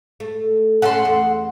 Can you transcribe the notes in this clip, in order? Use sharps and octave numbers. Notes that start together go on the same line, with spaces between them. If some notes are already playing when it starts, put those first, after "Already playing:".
A3
A3 C#4 A4 F#5 C6
E2